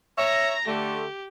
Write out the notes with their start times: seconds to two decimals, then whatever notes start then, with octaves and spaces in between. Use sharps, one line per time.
0.18 C#5 E5 A#5 A#6
0.67 D3 A3 G4